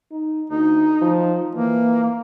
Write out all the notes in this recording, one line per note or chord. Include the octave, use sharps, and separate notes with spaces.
D#4
D2 D#4
F3
E3 A#3